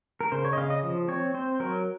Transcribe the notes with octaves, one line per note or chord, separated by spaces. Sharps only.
A#4
C#3 C5
C#5
D#5
C#3 F5
D#5
F3
C4 C#5
C4 C5
F#3 A#4